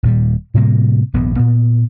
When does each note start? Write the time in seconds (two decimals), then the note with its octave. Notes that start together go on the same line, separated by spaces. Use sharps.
0.03 D#1 A#2 G3
0.54 A2 C3 G3 A#3
1.14 D#1 A#1 G#2 B3
1.36 A#2 B3